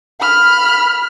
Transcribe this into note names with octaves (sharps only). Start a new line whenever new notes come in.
B5 F6